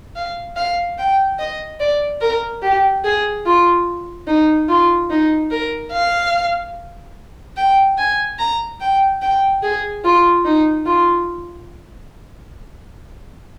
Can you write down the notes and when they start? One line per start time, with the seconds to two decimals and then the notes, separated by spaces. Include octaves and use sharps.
0.16 F5
0.57 F5
0.99 G5
1.39 D#5
1.80 D5
2.21 A#4
2.63 G4
3.04 G#4
3.46 F4
4.28 D#4
4.69 F4
5.10 D#4
5.51 A#4
5.92 F5
7.57 G5
7.98 G#5
8.39 A#5
8.81 G5
9.22 G5
9.63 G#4
10.04 F4
10.45 D#4
10.86 F4